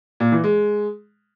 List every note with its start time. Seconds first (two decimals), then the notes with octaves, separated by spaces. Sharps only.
0.20 A#2
0.32 E3
0.44 G#3